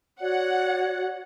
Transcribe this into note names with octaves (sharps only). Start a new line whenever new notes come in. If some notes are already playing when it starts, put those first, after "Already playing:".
F#4 C#5 D5 F#5